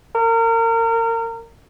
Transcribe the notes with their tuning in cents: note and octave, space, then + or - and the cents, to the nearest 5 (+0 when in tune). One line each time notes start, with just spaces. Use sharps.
A#4 -30